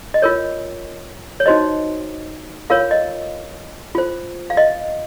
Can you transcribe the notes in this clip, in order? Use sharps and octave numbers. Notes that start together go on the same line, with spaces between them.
D#5
F4 A#4 C#5
C#5
D#4 F#4 C5 D#5
F4 A#4 C#5 F5
D#5
F4 C5
F5
D#5